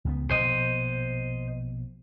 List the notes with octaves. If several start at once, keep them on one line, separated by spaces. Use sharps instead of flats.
C#2 C#3 B3
A#1 B2 C5 D#5